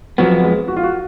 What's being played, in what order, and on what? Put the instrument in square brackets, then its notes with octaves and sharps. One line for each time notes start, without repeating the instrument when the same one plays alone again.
[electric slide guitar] F2 F3 B3 [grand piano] F#3
[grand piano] G#3
F#4
F4
F#4